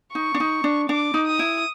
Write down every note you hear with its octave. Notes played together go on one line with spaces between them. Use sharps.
D#4 C#6
D4
D#4
D4
D4 D6
D#4
D#6
E4